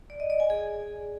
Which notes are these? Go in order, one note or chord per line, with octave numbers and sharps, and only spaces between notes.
D5
D#5
D5
G#5
G#4